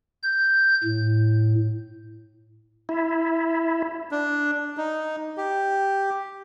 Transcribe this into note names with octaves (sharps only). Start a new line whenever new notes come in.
G6
A2
E4
D4
D#4
G4